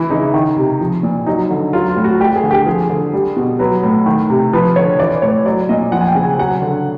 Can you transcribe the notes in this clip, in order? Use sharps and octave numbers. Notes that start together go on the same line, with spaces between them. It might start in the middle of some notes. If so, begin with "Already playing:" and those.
Already playing: E3 E4
C#3 D#4
D#3
C3
F3
A#2
F#3 D#4
D3
F#3 F4
F4
A2
F#4
G3 G4
G#4
D3
G4
F3 G#4
D3
G3
B2
F#3 B4
A2
D#3
C3
F3 B4
D3 C#5
E3 D5
A2 C#5
F#3 D5
A#2 D#5
F3 F#5
G#5
G5
C#3
G#5
F#3 F#5
D3